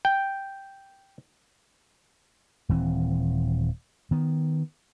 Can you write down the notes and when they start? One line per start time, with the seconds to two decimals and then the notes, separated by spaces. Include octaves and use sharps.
0.05 G5
2.69 D#1 E3 C4
4.11 D#3 B3